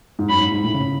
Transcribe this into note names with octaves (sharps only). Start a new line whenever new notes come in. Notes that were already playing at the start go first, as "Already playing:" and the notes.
G#2
F#2 B5
G#2
G#2
A2
C#3